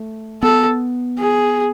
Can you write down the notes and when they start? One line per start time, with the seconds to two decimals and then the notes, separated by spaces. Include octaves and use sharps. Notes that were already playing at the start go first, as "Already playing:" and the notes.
Already playing: A3
0.43 B3 A4
1.18 G#4